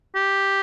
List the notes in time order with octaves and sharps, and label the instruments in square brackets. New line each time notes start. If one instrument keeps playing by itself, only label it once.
[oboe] G4